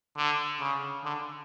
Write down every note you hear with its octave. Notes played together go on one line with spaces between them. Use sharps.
D3
C#3
D3